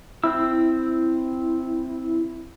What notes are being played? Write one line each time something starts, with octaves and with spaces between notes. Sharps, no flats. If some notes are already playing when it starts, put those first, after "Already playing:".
C4 E4 E6